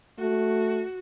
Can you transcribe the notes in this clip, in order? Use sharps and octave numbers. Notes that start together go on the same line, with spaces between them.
A3 F#4